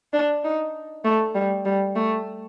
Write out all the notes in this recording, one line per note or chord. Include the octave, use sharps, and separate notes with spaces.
D4
D#4
A3
G3
G3
A3